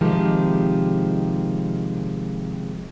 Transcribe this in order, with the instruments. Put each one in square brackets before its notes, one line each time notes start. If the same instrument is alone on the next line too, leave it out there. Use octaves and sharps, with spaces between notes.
[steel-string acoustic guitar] C3 D#3 F3 G#3 G4